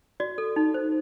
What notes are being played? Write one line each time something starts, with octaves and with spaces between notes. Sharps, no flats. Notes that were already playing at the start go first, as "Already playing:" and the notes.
F#4 D5
A4
D#4
C5